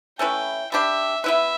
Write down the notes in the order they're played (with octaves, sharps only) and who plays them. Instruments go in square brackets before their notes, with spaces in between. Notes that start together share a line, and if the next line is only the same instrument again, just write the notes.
[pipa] A3 C#4 E4 B4 [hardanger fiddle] G5
[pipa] G3 D4 G4 [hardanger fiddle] E5
[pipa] B3 E4 B4 [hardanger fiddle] E5